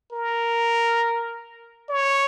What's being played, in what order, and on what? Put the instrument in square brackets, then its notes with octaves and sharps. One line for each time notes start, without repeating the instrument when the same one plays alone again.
[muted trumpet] A#4
C#5